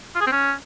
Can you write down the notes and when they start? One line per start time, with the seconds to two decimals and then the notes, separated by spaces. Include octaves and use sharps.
0.15 F4
0.21 G#4
0.26 C4
0.32 C#4